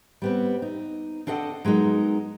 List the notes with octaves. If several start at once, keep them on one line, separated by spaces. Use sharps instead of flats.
G3 B3 C4
D#4
C4 D4 A4 D#5 F#5
F#3 G#3 B3 D#4 A#4